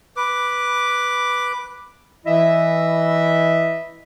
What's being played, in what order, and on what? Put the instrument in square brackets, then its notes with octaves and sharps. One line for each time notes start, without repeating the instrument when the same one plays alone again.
[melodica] B4 D6
[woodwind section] E3 E4 D#5 E5